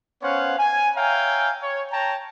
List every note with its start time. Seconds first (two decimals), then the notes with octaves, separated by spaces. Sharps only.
0.23 B3 C#4 C5 C#5 F5 F#5
0.58 G#5
0.96 C#5 E5 F5 G5 G#5 A#5
1.63 C#5
1.92 C#5 G5 A5 A#5